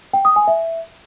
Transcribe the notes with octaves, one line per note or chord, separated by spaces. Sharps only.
G5
D#6
G#5
E5